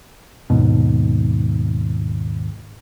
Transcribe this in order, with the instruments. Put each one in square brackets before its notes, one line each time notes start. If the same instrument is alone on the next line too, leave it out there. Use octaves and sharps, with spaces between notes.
[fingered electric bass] D#2 G#2 B2